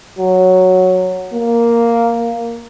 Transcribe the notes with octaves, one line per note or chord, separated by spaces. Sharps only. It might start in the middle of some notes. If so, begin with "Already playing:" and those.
F#3
A#3